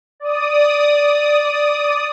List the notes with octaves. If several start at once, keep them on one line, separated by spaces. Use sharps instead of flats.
D5 D#6